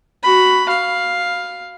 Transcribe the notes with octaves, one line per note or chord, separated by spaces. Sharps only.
F#4 B5
F5